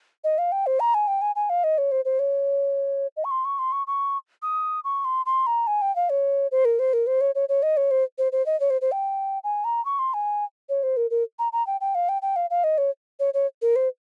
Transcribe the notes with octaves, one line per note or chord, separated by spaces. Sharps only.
D#5
F5
G5
C5
A#5
G#5
G5
G#5
G#5
F5
D#5
C#5
C5
C5
C#5
D#5
C#6
C6
C#6
C6
C#6
C#6
D#6
C#6
C6
C6
A#5
G#5
G5
F5
C#5
C5
A#4
C5
A#4
C5
C#5
C#5
C#5
D#5
C#5
C5
C5
C5
D#5
C#5
C5
C5
G5
G#5
A#5
C#6
C6
G#5
C#5
C5
A#4
A#4
A#5
A#5
G5
G5
F5
G5
G5
F5
F5
D#5
C#5
C#5
C#5
A#4
C5